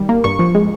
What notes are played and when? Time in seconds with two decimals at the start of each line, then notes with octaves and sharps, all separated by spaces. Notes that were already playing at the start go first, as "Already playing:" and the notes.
Already playing: D#3 G3
0.09 A#3
0.24 G2 C#6
0.39 F3
0.55 G#3